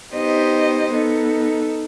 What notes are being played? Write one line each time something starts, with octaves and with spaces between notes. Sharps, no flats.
B3 D#4 G4 C5 D#5
B3 D#4 A4